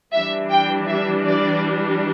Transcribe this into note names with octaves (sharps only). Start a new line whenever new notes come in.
E3 G3 D4 E5
G5
E5
D5